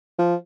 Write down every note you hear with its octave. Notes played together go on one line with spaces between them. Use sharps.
F3